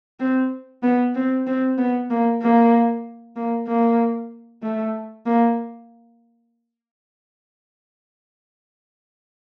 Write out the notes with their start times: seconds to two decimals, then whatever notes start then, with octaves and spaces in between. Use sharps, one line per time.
0.20 C4
0.83 B3
1.15 C4
1.47 C4
1.78 B3
2.10 A#3
2.41 A#3
3.36 A#3
3.68 A#3
4.62 A3
5.26 A#3